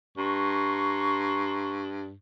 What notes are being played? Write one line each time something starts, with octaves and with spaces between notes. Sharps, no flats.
G2 A#5 C6 C#6